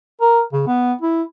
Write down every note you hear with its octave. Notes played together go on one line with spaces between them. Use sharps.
A#4
C#3
B3
E4